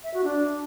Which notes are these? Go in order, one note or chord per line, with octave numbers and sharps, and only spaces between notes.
E5
F#4
D4